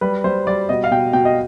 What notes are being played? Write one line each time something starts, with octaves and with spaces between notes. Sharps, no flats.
G3 B4
G3 C5
G3 D5
B2 D#5
F5
B2 G5
B2 G5
D#5